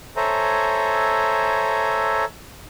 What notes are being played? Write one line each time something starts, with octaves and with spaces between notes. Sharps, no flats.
A4 C5 C#5 E5 G#5 A#5